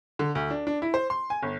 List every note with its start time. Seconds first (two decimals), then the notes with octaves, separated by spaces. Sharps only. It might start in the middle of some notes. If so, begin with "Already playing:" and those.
0.19 D3
0.35 D2
0.50 D4
0.67 D4
0.82 E4
0.94 C5
1.10 C6
1.30 G#5
1.43 G1